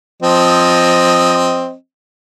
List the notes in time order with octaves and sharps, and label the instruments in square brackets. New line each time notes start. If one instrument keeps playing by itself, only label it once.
[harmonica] F3 C4 D#5